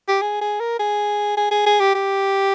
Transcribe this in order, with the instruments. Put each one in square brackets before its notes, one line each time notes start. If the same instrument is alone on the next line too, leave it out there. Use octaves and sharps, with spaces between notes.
[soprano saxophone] G4
G#4
G#4
A#4
G#4
G#4
G#4
G#4
G4
G4